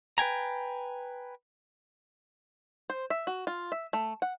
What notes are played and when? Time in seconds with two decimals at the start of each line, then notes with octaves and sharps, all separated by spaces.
0.18 B4 G5 G#5 A#5
2.90 C5
3.10 E5
3.27 F#4
3.47 F4
3.72 E5
3.93 A3
4.22 F#5